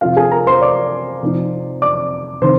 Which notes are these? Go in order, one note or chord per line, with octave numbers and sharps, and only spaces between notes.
C3 F3 C4 F4 F5
G#4 G#5
A#4 A#5
C5 C6
D5 D6
C3 F3 C4 D#4
D5 D6
C3 D#3 C5 C6